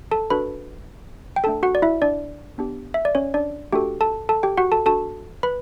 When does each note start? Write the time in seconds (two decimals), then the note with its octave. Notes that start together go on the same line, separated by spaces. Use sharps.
0.11 A4 A5
0.30 D4 F#4 A4 B4 B5
1.36 G5
1.44 A3 D4 A4 A5
1.63 F#4 F#5
1.75 D5
1.82 E4 E5
2.02 D4 D5
2.58 B3 D4 G4
2.94 E5
3.05 D5
3.15 C#4 C#5
3.34 D4 D5
3.73 A3 D4 F#4 G4 A4 G5
4.01 A4 A5
4.29 A4 A5
4.43 G4 G5
4.57 F#4 F#5
4.72 A4 A5
4.86 D4 F#4 A4 A5
5.43 B4 B5